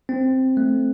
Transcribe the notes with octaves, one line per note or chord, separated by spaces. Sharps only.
C4
A3